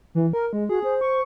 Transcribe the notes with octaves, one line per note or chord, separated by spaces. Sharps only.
E3
A#4
G#3
F#4 G#4
C5
C#6